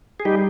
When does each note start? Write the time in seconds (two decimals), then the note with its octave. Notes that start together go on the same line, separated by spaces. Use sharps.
0.20 G#4
0.25 G3 D#4 G4